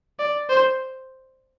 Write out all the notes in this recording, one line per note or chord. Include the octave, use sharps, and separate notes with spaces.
D5
C5